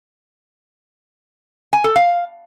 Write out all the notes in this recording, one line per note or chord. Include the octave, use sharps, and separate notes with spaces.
G#5
A4
F5